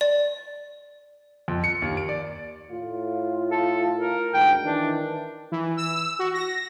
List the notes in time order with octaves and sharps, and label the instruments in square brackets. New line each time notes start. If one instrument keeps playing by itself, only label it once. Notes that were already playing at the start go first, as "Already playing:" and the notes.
[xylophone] D5
[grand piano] F2
C#7
D#2
D7
D5
[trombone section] A2 F4
[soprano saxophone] A4
A#4
[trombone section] D2 G#2 [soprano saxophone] G5
[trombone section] D#3 E3 [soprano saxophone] D4
[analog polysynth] E3
E6
F#4
A#6